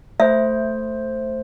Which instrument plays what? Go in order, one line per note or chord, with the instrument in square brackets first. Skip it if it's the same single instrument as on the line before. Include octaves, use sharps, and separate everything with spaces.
[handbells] A3 C5 [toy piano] E5